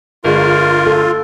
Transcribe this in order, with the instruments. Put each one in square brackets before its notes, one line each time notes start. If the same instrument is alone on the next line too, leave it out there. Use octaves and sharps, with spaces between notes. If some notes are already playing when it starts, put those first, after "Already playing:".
[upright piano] G1 G#3 [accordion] F4 [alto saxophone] A#4
[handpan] A4